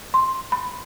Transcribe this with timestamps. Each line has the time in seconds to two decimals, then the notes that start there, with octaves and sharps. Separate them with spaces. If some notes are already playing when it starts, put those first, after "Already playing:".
0.14 C6
0.52 B5